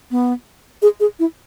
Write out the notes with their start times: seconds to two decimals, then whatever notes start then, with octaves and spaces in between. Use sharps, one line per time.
0.11 B3
0.82 G#4
1.00 G#4
1.19 E4